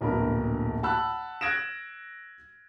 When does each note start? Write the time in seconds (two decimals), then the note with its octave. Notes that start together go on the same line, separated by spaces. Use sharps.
0.01 D1 A#1 B2 A#4 B5
0.83 F#5 A5 B5 E6 F#6
1.41 F#6 G#6 A#6 D7 E7